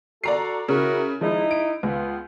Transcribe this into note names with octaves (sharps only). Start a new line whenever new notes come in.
F#4 A4 D5 A#5 C7
C#3 E4 F#4 A#4
F3 G#3 D#4 E4
D7
C#2 B3 F4